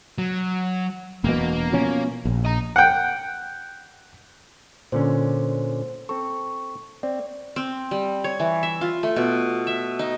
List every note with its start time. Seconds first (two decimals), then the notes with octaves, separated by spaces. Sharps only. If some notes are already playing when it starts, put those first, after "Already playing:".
0.18 F#3
1.24 E1 B2 A#3
1.73 B2 F3 C#4
2.25 A#1
2.45 D#5 A#5
2.76 F#5 G5
4.92 A#2 D3 C#4 C5
6.09 C4 A4 C#6
7.03 C4 D5
7.56 C4
7.91 G3
8.24 C#5
8.40 E3
8.63 E5
8.81 F4
9.03 A3
9.16 B2
9.67 E5
9.99 D#4